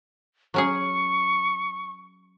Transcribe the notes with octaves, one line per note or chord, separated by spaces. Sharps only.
F#3 C#4 G#4 C#6